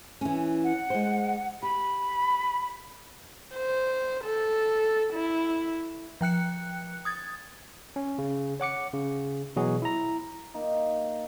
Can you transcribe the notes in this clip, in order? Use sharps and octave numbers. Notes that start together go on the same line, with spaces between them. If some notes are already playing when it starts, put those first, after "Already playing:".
E3 C#4
F#5
G#3 C5
G4 B5
C5
A4
E4
F3 G5 F#6 C#7
D#6 G#6 A6
C#4
C#3
C#5 F#5 D6 C#7
C#3
B2 E3 F#3 F#4 G#4
E4 A#5
A#3 D#4